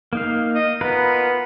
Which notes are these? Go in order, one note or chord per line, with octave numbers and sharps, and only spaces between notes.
A#3 D#4 F5
D#5
B3 F4 A#4 B4